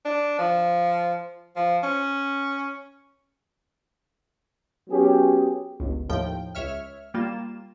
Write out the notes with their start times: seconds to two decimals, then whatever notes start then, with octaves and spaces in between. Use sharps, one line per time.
0.05 D4
0.39 F3
1.56 F3
1.83 C#4
4.89 F#3 B3 C#4 G4 G#4
5.80 G1 C#2
6.09 D#2 A2 F3 G5
6.55 C#2 C#5 E5 F6
7.14 G3 A#3 F4 E7